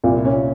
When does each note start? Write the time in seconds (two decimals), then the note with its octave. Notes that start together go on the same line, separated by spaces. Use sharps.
0.04 C2 A#2
0.25 C#4